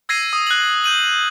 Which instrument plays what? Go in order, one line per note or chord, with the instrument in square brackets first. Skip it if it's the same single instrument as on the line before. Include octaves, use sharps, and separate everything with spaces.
[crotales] E6 G#6 A#6 C7 D#7
D#6
F#6 F#7
G6 D#7 F#7